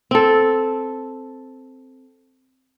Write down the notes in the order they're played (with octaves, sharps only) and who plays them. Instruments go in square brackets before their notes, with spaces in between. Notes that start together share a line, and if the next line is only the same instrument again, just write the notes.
[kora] C4 A4